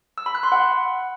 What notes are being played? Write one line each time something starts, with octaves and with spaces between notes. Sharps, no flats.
E6
B5
F#6
C6
F#5